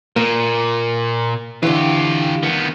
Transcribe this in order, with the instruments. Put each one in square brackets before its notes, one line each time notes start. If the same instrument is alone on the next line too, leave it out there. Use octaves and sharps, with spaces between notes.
[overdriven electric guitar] A#2 [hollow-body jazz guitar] A#3
[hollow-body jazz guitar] D3 E3 [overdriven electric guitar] F4 G4
[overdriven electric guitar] D#3 B3